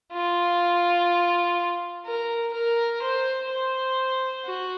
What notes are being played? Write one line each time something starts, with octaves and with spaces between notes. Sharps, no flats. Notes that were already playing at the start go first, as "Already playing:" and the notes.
F4
A#4
A#4
C5
C5
F#4